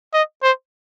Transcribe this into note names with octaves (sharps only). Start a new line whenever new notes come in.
D#5
C5